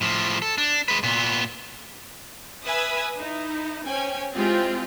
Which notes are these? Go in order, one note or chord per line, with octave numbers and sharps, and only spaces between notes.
A2 F3
A4
D4
G#3 B4
A#2 B3
B4 E5 G#5 B5 D#6 E6
D#4 E4
C#4 C5 G5 G#5
G#3 C4 E4 F4 G4 G#4